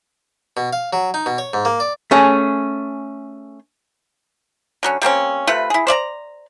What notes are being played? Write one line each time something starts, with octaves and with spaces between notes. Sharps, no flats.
B2
F5
F#3
D#4
B2
C#5
G#2
A#3
D5
A3 C#4 G#4
D3 F#3 C#4
G3 A#3 C4 C#4
C3 A3 F4 B4
E4 G#4
C5 D5 E5 A#5